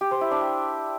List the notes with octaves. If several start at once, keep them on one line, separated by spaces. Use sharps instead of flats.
G4
C5
E4
D4
G4